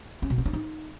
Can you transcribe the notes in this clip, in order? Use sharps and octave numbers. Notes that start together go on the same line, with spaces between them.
C#4
B2
C#4
D4
D#4